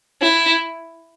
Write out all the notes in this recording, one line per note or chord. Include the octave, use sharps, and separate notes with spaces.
E4